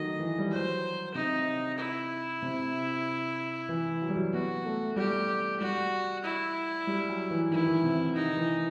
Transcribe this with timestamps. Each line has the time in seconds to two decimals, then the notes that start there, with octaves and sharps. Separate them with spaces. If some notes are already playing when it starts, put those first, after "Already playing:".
Already playing: D#3 F#3 A3 D#5
0.19 E3
0.39 G3
0.50 F#3 C5
1.14 C3 D#4
1.78 E4
2.42 C3
3.69 E3
4.02 F#3
4.09 G3
4.16 F#3
4.33 B3 F#4
4.65 A3
4.96 G3 G4
5.60 G3 F#4
6.24 E4
6.87 G3
7.09 F#3
7.31 E3
7.51 D#3 E4
7.58 E3
7.66 D#3
7.84 C3
8.15 D#3 D#4
8.37 E3